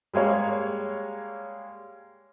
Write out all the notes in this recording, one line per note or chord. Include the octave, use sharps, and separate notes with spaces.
G3 G#3 A#3 C#5